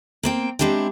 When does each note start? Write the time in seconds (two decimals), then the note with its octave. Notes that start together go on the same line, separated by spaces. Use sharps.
0.23 A#3 C4 G5
0.59 G#3 C4 D4 E4 G4